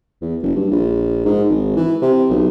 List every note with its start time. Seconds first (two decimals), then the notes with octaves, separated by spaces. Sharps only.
0.21 E2
0.42 F#1
0.56 G2
0.71 A#1
1.25 G#2
1.49 G#1
1.76 E3
2.02 C3
2.30 B1